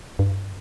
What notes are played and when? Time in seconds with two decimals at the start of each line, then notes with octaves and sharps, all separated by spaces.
0.19 G2